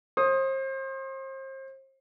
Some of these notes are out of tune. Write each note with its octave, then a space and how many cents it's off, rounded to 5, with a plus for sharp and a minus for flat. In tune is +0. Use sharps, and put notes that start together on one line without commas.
C5 +35 D#6 +0